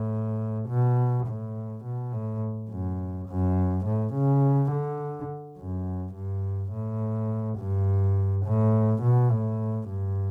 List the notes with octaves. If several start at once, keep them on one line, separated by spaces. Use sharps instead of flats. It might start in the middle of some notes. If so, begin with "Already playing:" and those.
Already playing: A2
B2
A2
B2
A2
F#2
F#2
A2
C#3
D3
F#2
G2
A2
G2
A2
B2
A2
G2